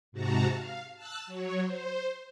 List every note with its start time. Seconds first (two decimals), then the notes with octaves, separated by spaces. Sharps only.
0.12 G#2 C3 F#4 A5 A#5
0.52 F5
0.96 A5 E6 F#6 A6
1.26 F#3 C#5
1.61 C5